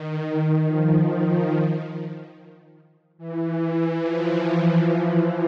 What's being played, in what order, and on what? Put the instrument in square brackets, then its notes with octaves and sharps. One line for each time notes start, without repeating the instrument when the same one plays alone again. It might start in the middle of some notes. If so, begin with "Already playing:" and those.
Already playing: [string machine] D#3
F3
E3
F3